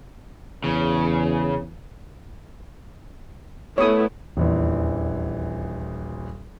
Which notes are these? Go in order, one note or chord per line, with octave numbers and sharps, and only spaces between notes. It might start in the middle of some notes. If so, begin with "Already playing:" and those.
E2 C#3
A3 B3 E4 C#5 D#6
D#1 A#1 E2 E3